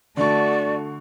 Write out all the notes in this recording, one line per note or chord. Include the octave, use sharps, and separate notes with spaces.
D3 A3 F#4 A4 D5 C#6